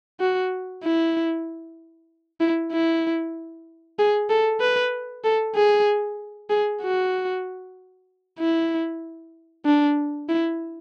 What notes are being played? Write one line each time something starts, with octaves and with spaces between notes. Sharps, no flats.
F#4
E4
E4
E4
G#4
A4
B4
A4
G#4
G#4
F#4
E4
D4
E4